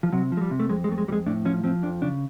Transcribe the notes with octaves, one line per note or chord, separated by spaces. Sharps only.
F3
C3 F#3
F3
G#3
G3
C3
A3
F2 G#3
G#3
F2 A3
G#3
F2 G3 G#3
A2 D4
F3 C#4
F3 C4
F2 D4
C#3 D4